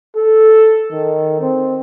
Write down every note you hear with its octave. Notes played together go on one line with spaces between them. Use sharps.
A4
D#3
C4